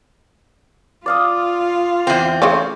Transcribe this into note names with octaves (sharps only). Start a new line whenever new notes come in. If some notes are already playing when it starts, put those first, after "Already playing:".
F4 D5 F5 D#6
E2 C4
C#3 F3 A3